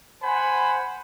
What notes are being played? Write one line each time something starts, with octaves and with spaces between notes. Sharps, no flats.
C5 F#5 G#5 B5